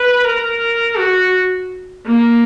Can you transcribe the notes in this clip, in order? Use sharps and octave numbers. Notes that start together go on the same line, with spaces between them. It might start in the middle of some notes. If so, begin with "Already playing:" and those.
Already playing: B4
A#4
F#4
A#3